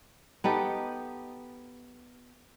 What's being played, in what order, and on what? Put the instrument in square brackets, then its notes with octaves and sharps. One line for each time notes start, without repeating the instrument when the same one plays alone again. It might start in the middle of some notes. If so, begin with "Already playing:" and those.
[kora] B3 D#4 G4 A4